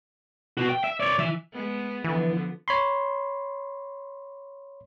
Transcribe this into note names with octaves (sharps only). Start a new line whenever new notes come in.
B2 F#4
G5
E5
C#5 D5
E3 E5
G#3 B3
D3 E3 F3 B3
C#5 B5 C6